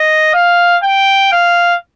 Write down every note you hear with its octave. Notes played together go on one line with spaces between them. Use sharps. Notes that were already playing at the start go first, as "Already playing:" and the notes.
Already playing: D#5
F5
G5
F5